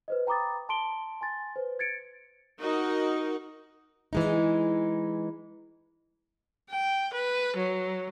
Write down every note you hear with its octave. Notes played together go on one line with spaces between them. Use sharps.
B4 C5 D#5
G5 A#5 B5 D6 D#6 A6
A5 C6 D7 G7
G#5 C6 A6
B4 C5
G#6 A6 C#7 D7
D#4 F#4 A#4
E3 G#3 D#4
G5
B4
F#3